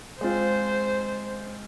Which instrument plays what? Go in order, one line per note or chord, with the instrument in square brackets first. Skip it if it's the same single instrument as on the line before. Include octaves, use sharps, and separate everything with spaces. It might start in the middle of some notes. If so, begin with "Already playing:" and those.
[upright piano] G#3 C4 F4 [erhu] C5